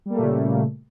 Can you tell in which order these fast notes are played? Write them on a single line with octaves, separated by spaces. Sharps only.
G3 A#3 A3 A#2 C#3